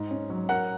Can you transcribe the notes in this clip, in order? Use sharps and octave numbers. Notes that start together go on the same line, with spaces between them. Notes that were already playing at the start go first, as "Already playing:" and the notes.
Already playing: G#2
C#4
F#3
A#4 F#5